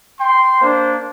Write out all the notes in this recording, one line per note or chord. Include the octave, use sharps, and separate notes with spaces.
G5 C6
A#3 D4 C5